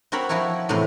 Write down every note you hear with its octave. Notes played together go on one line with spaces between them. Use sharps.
C4 F#4 A#4 C5 C#5 B5
F3 E4 F#4 A#4 C#5
E2 A2 C3 B4 A#5 C6